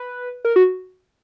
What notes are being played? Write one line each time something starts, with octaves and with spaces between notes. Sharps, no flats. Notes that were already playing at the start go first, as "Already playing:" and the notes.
Already playing: B4
A#4
F#4